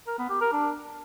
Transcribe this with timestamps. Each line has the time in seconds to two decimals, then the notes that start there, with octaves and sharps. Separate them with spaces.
0.07 A#4
0.18 B3
0.30 G4
0.41 A#4
0.52 D4